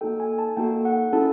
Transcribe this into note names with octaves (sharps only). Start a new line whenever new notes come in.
A#3 D#4 F#4 A4 G5
G#5
A5
A#3 D#4 F#4 A4 G5
F#5
C#4 E4 A4 A5